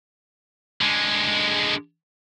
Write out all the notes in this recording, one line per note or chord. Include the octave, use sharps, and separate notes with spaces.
D3 G#3